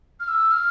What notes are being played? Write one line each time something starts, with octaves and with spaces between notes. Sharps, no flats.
F6
E6
F6